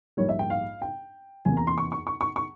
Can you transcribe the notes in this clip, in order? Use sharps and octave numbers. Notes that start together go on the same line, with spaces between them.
A#1 G#2 G3 A#3 C#5
E5
G5
F5
G5
E2 C3 E3 A#3 G#5
A#5
C6
C#6
C#6
C#6
C#6
C#6